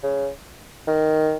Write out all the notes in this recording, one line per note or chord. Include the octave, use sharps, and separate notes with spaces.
C#3
D#3